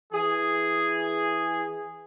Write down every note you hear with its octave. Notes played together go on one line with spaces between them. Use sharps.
E3 G#4